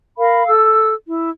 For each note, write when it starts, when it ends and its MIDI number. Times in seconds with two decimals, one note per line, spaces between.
0.18 0.47 70
0.18 0.47 77
0.18 0.47 83
0.47 0.92 69
0.47 0.92 88
1.06 1.29 64